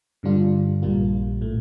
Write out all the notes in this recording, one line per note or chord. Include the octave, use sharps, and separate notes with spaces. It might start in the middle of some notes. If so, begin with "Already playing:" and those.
G2 D3 G3 D4 F4
A#1 A#2 G3 A#3 F4
A2 A3